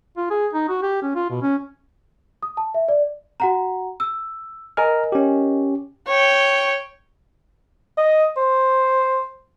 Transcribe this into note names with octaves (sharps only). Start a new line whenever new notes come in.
F4
G#4
D#4
F#4
G4
C#4
F4
B2
C#4
D#6
A5
E5
D5
F#4 F#5 A#5
E6
A#4 D#5 G#5 A#5 F6
C#4 G4
C#5 G5
D#5
C5